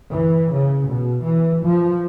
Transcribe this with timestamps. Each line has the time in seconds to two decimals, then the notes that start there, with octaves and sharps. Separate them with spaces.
0.13 E3
0.54 C#3
0.88 B2
1.25 E3
1.65 F3